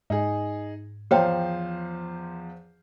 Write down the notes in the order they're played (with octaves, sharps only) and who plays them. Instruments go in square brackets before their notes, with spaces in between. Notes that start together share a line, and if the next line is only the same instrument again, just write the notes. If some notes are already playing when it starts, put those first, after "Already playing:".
[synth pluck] G#2 [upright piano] D#4 G#4
[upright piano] E2 F3 [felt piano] C5 F5 [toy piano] C#5 G5 A#5